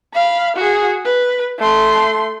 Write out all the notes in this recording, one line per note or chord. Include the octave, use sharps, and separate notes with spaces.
F5 B5
F#4 G#4
B4
A3 C6